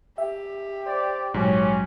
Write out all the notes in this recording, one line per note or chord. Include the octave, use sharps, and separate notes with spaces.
G4 E5
C5 D5
A#1 G#2 F#3 C#4